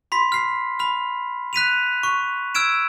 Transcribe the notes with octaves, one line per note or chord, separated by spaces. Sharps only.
B5 C6 B6
F6 C7
B5 F6
F#6 B6 D#7 F7
C#6
E6 F6 G#6 D7 E7